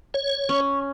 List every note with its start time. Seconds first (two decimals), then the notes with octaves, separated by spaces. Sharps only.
0.14 C#5
0.49 C#4 C#6